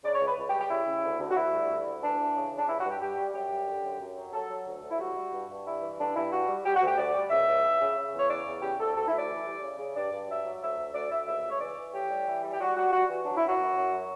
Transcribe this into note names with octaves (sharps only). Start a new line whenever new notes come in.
C#3 D5
C#5
C#2
B4
C#2
G4
G3
G4
C#3 E4
C#3
D2
D2
F#4
D2 E4
G3
D2
D2
E3 D4
E3
C#3
C#3
D4
G2 E4
F#4
G2
G4
G2 G4
G3
F#2 G4
G3
D3
F#2
F#2
F#3
F#3 A4
F#3
D2
D2
E4
G3 F#4
G3
G2
G2
G3 E4
E3
G2 D4
G2 E4
G3 F#4
G3
G3 G4
F#4
D2
G4
D2 D5
G3
C#2 E5
C#2
C#2
C#3
C#3
E2
C#5
C#3 D5
E2
C#3 G4
D2 A4
D2 A4
E4
D2
D5
E3
G3
C#3
C#3
G2 D5
G2
F#3 E5
F#3
D2 E5
D2
D2 D5
D2 E5
C#2 E5
C#2
C#5
E3 D5
E3
A2 G4
G3
E3
G3
G4
G3 F#4
G3 F#4
G3 F#4
E3
F#3 D4
E4
F#2
F#4
F#2
F#2
F#3